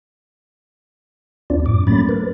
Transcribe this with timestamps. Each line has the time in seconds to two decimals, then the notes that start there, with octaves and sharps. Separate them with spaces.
1.50 D#2 C4 D4 F4 D5
1.66 F#2 A2 D6
1.87 F#3 A3 A#3 C#4 B5 A6
2.09 A#4 B4